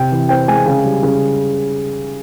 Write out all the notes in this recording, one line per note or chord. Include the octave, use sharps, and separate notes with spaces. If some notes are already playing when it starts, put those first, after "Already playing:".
Already playing: C3 G5
E3
C4 G5
G#3 G#5
C#3 G#5
G3
C#3